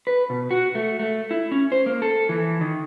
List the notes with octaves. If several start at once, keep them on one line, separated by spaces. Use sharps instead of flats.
B4
B2
F#4
A3
A3
E4
C#4
C5
A#3
A4
E3
D#3